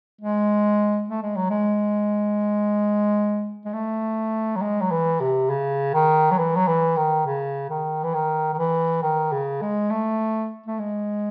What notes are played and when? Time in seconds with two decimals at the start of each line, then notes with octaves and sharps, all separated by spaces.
0.21 G#3
1.10 A3
1.22 G#3
1.37 F#3
1.50 G#3
3.65 G#3
3.73 A3
4.56 F#3
4.62 G#3
4.81 F#3
4.91 E3
5.20 C3
5.50 C#3
5.94 D#3
6.31 F#3
6.38 E3
6.56 F#3
6.67 E3
6.97 D#3
7.26 C#3
7.70 D#3
8.04 E3
8.14 D#3
8.53 D#3
8.58 E3
9.03 D#3
9.32 C#3
9.62 G#3
9.90 A3
10.66 A3
10.79 G#3